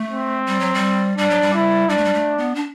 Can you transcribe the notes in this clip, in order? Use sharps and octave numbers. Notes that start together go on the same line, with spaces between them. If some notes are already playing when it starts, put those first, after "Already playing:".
Already playing: A3
C4
G3
F#3
G3
G3 D4
F#3
G3
E4
G3 D4
A3
G3
A3
B3
D4